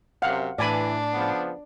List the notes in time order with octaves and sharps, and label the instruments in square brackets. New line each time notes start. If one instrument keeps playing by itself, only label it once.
[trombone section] F#2 C3 [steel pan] F5 F#5
[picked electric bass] A2 [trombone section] E3 [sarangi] D4 [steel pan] D5 G#5 B5
[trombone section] C#3 F3 B3